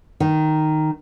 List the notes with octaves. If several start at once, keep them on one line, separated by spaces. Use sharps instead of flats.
D#3